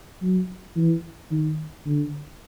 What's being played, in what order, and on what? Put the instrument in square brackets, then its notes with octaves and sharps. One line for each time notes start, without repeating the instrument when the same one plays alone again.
[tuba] F#3
E3
D#3
D3